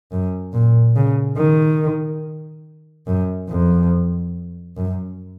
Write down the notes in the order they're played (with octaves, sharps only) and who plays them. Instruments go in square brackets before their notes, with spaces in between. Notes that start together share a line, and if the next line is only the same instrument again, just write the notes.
[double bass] F#2
A#2
C#3
D#3
F#2
F2
F#2